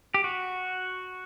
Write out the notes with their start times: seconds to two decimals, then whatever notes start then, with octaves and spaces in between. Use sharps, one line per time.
0.14 G4
0.24 F#4